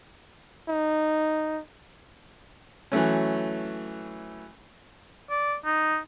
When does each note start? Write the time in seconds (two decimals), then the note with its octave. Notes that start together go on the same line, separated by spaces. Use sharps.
0.69 D#4
2.92 E3 F#3 A3 C#4
5.30 D5
5.65 D#4